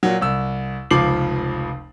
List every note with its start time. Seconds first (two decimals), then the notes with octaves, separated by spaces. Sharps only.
0.03 A#2 F#3
0.21 C2 E6
0.91 F1 C#2 F3 D6 C7 F#7